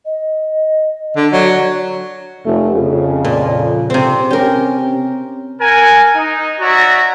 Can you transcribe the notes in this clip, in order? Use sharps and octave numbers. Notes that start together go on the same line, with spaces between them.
D#5
D3
F#3 D5
F1 A3
F2 C#3
A#2
C3 C4
C#4 G4 A#4
A#4 F#5 G#5
D#4
F#4 C#5 D5 E5 A#5